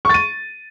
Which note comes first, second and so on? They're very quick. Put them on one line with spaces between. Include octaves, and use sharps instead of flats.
C#6 A6 D#7